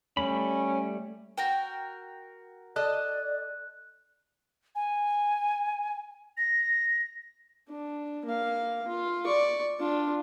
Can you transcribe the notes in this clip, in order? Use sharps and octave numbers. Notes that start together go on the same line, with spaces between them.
G3 A3 C#4 B5
F#4 A#4 G5
A4 D5 D#5 F#6
G#5
A#6
D4
A#3 F5
F4
D5 C#6
D4 F4